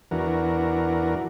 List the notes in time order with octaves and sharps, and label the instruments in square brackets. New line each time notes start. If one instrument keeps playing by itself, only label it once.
[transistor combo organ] E2 E3 D4 F#4 A#4